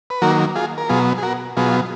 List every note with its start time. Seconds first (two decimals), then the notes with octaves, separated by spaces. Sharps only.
0.10 B4
0.22 D#3 F#3 A#3 F#4 A#4
0.55 F4 G#4
0.78 A#4
0.89 B2 F#3 B3 F4 G#4
1.18 G#4
1.23 F#4 A#4
1.57 B2 F#3 B3 F4 G#4